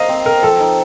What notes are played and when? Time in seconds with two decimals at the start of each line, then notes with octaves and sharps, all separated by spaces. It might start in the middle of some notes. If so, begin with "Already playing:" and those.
Already playing: A#3 D#4 C5 D#5 F5
0.09 C4
0.26 A#4 C5
0.43 F3 A4
0.60 D#4